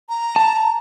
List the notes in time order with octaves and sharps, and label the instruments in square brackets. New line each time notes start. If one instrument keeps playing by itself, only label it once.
[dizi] A#5
[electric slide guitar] A5